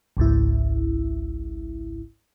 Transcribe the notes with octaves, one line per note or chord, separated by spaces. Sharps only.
G#1 C#2 G#2 E4